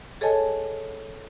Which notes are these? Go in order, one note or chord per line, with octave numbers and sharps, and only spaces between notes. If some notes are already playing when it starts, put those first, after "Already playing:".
G#4 A4 C#5 D#5 G#5 A5